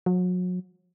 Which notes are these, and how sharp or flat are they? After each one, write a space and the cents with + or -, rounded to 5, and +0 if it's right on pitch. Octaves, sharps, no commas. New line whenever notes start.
F#3 -35